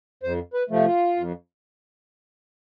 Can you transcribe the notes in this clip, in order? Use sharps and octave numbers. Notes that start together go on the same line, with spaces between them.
F2 C5
B4
C3 F3 A3
F4
F2